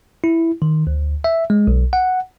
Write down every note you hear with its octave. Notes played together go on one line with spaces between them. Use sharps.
E4
D#3
D2
E5
G#3
B1
F#5